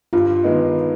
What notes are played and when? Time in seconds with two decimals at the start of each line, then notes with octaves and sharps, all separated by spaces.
0.13 G2 F4
0.44 D#3 G#3 B3 D#4